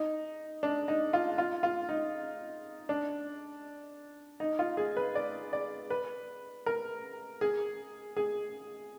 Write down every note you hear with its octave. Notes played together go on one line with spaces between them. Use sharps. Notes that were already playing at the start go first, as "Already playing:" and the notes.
Already playing: D#4
D4
D#4
F4
F4
F4
D#4
D4
D#4
F4
G#4
B4
D5
D5
B4
A#4
G#4
G#4